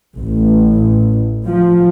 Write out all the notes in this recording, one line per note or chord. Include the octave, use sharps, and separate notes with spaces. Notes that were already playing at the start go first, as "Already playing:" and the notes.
A1
F3